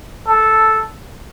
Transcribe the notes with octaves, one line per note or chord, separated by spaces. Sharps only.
A4